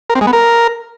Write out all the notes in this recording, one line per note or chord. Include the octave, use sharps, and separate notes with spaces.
A#4
C4
G#3
B3
A#4